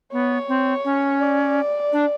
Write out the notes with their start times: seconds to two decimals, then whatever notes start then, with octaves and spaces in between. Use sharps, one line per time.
0.13 B3 C#5
0.48 C4
0.85 C#4
1.21 D5
1.93 D4